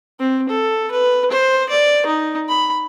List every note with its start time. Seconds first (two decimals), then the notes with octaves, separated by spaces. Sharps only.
0.19 C4
0.49 A4
0.91 B4
1.31 C5
1.69 D5
2.06 D#4
2.49 B5